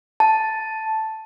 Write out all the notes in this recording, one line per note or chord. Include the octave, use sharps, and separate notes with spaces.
A5